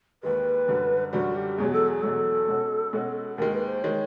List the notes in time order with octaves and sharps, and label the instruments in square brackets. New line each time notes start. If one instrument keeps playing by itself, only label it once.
[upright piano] D#2 D#3 G#3 [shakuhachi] B4
[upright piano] F#2 D3 G3
[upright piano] F#2 D3 G3 [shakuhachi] F#4
[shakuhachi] G4
[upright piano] E2 B2 F#3 [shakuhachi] G#4
[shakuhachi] A4
G#4
[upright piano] E2 B2 F#3 [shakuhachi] A4
[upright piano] B2 G#3 C#4 F#4
B2 G#3 C#4 F#4
[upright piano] D#2 D#3 G#3 [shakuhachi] A#4
[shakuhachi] B4
C5
[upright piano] D#3 G#3 [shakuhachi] C#5